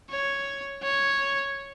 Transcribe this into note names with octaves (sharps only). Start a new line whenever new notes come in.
C#5
C#5